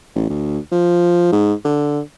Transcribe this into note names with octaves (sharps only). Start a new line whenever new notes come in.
A1
D2
F3
G#2
D3